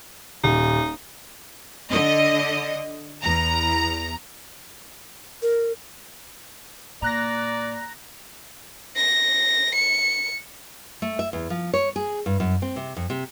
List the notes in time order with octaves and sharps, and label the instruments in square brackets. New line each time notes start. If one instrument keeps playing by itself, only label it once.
[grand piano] D#1 [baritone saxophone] D#4
[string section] D3 D#5
E2 A#5
[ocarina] A#4
[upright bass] A#2 [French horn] D5 [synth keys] A#5 F#6 A#6
[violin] A#6
C#7
[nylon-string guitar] A3
E5
E2
F3
C#5
G#4
G2
F#2
C4
C3
F2
C3